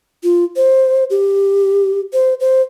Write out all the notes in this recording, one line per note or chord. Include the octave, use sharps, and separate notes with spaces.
F4
C5
G4
C5
C5